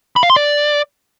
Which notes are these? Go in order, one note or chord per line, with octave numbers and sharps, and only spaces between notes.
B5
F5
C6
D5